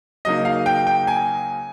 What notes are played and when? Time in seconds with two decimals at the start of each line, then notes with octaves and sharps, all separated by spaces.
0.25 C#3 F#3 A#3 D#4 D#5
0.45 F5
0.66 G5
0.87 G5
1.07 G#5